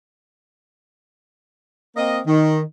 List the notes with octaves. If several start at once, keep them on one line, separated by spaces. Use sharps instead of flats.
A#3 C4 D#5
D#3